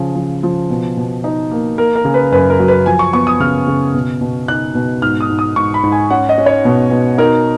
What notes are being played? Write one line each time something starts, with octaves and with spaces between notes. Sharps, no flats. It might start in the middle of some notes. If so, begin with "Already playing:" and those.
Already playing: C#3 F3
F3
F3
B2
B2
D#4
A#3
A#3 A#4
A#4
C#3
B4
F#2 B4
A#4
F#3
B4
F3 G#5
C#6
B3 C#6
D#6
C#3 F6
C#3
B2
B2
D#4 F#6
B2
G#2 F6
D#6
G#2
D#6
G#2 C#6
B5
G#2
G#5
C#4 F#5
D#5
C#4
C#5
B2
B2
D#4 A#4